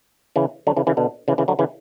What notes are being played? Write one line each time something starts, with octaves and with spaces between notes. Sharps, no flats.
C#3 E3
D3 F#3
C#3 E3
C#3 E3
B2 D3
C#3 E3
C#3 E3
D3 F#3
C#3 E3